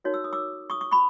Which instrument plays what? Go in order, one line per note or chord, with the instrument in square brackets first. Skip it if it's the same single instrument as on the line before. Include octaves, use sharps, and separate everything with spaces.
[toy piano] D#4 F#4 A#4 C#5
E6
D#6
D6 E6
C#6 D#6
C#6 D#6
B5 C#6